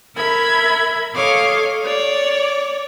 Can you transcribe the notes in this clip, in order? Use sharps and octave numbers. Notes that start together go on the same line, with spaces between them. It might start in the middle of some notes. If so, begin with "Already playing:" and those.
A#4 E5 B5 G#6
A4 C#5 D#5 F5 D6
C#5 D5 D6